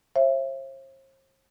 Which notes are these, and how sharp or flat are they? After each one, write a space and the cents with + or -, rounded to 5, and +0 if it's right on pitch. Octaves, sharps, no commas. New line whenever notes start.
C5 +45 E5 +30